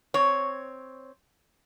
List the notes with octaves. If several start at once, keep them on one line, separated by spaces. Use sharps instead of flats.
C4 C#5